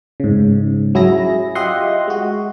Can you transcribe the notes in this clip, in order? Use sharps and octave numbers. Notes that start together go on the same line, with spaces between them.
G#2 C#3
F#3 E4 G#4 A#6
F4 G4 D#5 E5 F#5 C6
G#3 F#4